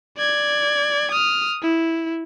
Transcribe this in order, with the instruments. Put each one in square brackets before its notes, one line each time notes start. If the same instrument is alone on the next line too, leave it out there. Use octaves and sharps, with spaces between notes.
[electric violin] D5 G#6
D#6 F6
E4